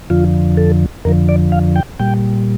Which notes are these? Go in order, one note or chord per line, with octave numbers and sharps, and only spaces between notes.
F2 D3 F3 F4
A4
F2 D3 F3 A#4
D5
F5
G5
A#2 G3 G5